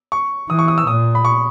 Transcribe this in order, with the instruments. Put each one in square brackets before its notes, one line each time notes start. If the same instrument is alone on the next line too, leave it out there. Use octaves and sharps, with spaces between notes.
[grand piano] C#6
[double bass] E3 [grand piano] D#6
[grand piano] C#6
D#6
E6
[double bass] A#2 [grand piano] D#6
[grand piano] B5
C#6